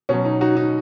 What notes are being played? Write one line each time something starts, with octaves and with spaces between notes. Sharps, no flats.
B2 F#3 C#4
D#4
D#4 F#4
D#4